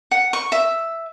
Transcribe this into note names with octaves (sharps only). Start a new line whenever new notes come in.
F#5
C#6
E5